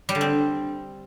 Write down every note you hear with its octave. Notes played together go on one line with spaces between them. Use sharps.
G3
D3
C4